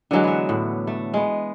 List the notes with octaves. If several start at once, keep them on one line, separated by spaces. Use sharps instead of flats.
D3 E3 F#3 G#3
B3 E5
A2
A3
G#3 B3